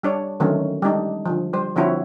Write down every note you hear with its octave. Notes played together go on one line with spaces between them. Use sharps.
G3 D4 C#5
D3 D#3 F#3 A3 C4 C#4
G3 G#3 D4 D#4
D3 F3
G3 C5
D3 F3 C4 E4 F#4 C#5